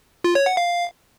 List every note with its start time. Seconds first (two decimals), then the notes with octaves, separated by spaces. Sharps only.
0.24 F4
0.35 C#5
0.46 F#5
0.57 F5